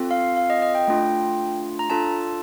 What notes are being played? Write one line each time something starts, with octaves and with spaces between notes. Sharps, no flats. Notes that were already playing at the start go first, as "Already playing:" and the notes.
Already playing: C4 F4 A4
F5
F5
D#5
D#5
G5
A3 D4 F4
A#5
D4 F4 A4 A5